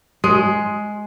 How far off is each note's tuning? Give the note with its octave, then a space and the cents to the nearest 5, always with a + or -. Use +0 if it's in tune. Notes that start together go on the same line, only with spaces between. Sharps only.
G#3 +10